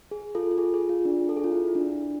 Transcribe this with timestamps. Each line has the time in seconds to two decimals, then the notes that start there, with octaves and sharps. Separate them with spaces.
0.11 G#4
0.35 F4 A4
0.51 F4
0.58 G#4
0.74 G#4
0.89 F4
1.05 D4
1.29 A4
1.37 G#4
1.44 F4
1.52 E4
1.68 E4
1.75 D4